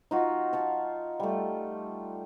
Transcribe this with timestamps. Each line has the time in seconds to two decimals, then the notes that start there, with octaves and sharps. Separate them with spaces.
0.11 D#4 F4 F#4
0.53 F5 A5 C#6
1.20 G3 A3